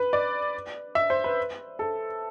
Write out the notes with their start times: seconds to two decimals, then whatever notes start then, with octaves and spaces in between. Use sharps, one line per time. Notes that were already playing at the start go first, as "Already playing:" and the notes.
Already playing: B4
0.13 D5
0.95 E5
1.10 C5
1.24 B4
1.79 A4